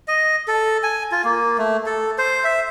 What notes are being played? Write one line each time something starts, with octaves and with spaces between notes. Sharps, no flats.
D#5
A4
G#5
F4
A#3
A3
A4
C5
E5